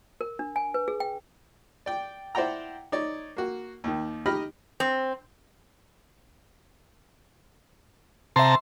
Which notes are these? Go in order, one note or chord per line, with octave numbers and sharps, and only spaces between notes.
A#4
D4
G#5
B4
G#4
G5
D5 G5
E4 C5 D5 F#5 G5 A#5
D#4 C#5 D5
A#3 F#4
D#2 D#3
D#4 G4 D#5 B5 F6
C4
C3 E5 A5 A#5 C6